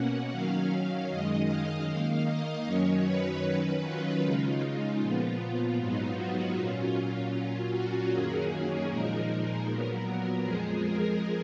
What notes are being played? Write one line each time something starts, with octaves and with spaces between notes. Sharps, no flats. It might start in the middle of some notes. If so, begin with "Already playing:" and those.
Already playing: B2 A#3 C#4 F#5
D#3 F#3 C#4 F5
F#2 D#3 G#3 D#5
F5
D#3 A#3 D#4
D#5
F#2 D#3 F#3 C#4 C#5
B4
D#3 F#3 C#4
F4
C#3 G#3 D#4
A#2 F3 B3 F4
G#2 F#3 B3 D#4
F#4
A#2 F#3 C#4 F4
A#2 F#3 C#4 F4
F#4
F#2 D#3 F#3 A#3 C#4 G#4
A#2 F3 G#3 D#4 A#4
A#2 F#3 B3
F2 F3 G#3 G#4
A#4